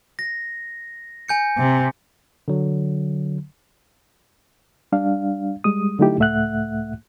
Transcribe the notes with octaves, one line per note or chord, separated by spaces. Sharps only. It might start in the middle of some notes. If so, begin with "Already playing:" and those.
A#6
G#5 G6 C#7
C3
D3 F#3
G3 D4 F5
G3 G#3 D#6
D3 F#3 A3 D#4 E4 G4
C#2 A2 A3 E5 F#5 F#6